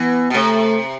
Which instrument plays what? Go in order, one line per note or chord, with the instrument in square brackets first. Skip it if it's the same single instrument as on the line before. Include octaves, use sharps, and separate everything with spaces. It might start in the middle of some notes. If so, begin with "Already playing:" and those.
Already playing: [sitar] E3 [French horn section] B3
[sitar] B2
[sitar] C3 [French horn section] A3